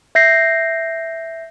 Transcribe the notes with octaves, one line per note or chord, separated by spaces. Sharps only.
E5 G6 A#6 C7